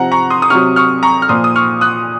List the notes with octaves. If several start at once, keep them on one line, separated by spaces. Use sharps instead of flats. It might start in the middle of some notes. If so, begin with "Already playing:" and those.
Already playing: C3 F3 F#5 A#5
A#5 C#6
C6 D#6
D#6
C3 F#3 C#6 F6
C#6 F6
A#5 C#6
F6
A#2 F3 C6 D#6
D#6
C#6 F6
D#6 F#6